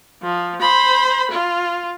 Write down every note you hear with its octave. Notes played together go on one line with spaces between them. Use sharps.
F3
C5 B5
F4